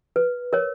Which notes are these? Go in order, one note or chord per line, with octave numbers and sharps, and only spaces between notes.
B4
A#4 C#5